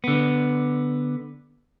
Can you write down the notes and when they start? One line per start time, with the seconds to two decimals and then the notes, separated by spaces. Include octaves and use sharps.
0.04 D3 B3